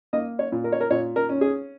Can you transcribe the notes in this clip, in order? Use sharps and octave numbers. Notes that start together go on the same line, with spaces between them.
A#3 D#5
C#5
A#2
A#4
C#5
A#4
A#2 C#5
A#4
C#4
G#4